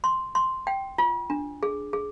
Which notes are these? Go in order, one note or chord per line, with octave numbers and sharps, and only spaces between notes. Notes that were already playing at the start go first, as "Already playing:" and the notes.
C6
C6
G5
F4
D4
G#4
G#4